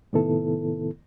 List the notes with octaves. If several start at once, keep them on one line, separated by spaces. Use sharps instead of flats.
A2 C3 D#3 B3 E4 A4